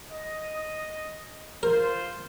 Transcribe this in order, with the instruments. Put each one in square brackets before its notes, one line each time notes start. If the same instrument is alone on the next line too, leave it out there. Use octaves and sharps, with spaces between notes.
[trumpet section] D#5
[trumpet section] F4 C5 [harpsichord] A#4